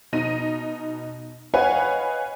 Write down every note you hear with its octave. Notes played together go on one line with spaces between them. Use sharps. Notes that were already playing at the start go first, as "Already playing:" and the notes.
B2 D#4 A#6 D#7
B4 C#5 D#5 F5 F#5 G#5